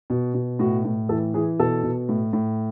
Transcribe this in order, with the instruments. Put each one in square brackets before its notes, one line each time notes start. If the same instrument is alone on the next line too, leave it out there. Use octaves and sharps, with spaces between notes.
[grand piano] B2
B2
A2 F#4
A2
E3 A4
E3 G#4
B2 A4
B2
A2
A2